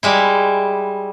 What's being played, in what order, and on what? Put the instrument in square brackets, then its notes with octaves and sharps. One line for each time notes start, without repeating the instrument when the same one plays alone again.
[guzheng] G3 G#3 E4